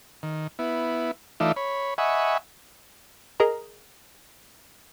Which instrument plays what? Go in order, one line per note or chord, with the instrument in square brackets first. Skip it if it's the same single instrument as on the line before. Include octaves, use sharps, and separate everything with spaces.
[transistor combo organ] D#3
B3 E4
E3 A3 D#4 F4 D5 E5
C#5 B5
D#5 E5 F#5 G#5 B5 C#6
[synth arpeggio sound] G#4 A#4 D#5 A#5